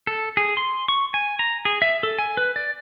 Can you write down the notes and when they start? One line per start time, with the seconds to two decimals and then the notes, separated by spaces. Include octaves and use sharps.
0.07 A4
0.37 G#4
0.57 C6
0.88 C#6
1.14 G#5
1.39 A#5
1.65 G#4
1.82 E5
2.03 A4
2.19 G#5
2.37 B4
2.56 D5